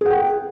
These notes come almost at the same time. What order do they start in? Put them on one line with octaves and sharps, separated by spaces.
G#4 F#5 G5